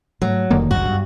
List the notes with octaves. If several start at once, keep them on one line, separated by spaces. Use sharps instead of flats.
G#2 F#3 A3
F1 D3 D#3 A#3
G1 C#2 F#2 F#4
G2